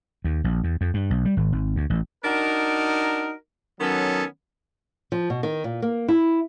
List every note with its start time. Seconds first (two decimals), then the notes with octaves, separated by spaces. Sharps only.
0.24 D#2
0.44 A#1
0.64 E2
0.81 F2
0.94 G2
1.10 B1
1.25 G3
1.37 G#1
1.52 G#1
1.76 D2
1.90 A1
2.25 D4 D#4 F#4 A#4
3.81 D#3 F#3 B3 C#4 A4
5.12 F3
5.30 B2
5.43 D#3
5.64 A#2
5.82 A#3
6.09 E4